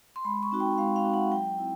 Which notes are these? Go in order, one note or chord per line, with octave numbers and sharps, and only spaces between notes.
C6
G#3 B5
C#6
C4 D#4 F#4
G5
G#3 F5
F5
C4 D#4 F#4
F#5
F#3 G5
C4 E4